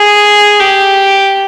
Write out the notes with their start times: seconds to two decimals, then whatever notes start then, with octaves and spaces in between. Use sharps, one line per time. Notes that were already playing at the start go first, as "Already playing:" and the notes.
Already playing: G#4
0.60 G4